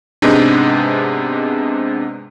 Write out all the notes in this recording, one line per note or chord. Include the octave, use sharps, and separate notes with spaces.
G#2 C3 G#3 B3 D4 D#4